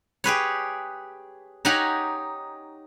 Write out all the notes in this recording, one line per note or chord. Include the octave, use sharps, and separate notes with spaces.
G4 G#4 B4 C#5
D#4 G4 C#5 F#5 G#5 A#5